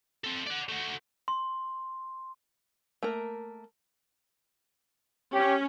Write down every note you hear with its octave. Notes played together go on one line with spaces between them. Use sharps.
C4 A4
D5 F#5
A3 F#4
C6
A3 A#3 A#4
C#4 G4